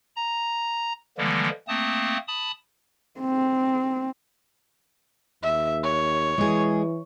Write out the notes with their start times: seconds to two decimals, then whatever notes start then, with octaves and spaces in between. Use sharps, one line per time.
0.16 A#5
1.18 D3 E3 F3 G3 G#3 A#3
1.68 A3 A#3 C4 A5 D#6
2.28 A5 B5 D#6
3.20 C4
5.43 D#2 E5
5.83 C#5
6.38 E3 G#3 G#4